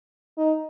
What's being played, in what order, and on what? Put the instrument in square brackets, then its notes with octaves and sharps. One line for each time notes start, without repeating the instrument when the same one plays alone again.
[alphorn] D#4